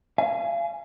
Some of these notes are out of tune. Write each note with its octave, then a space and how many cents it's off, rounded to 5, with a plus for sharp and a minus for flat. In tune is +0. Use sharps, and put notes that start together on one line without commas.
F5 -35 G#5 +0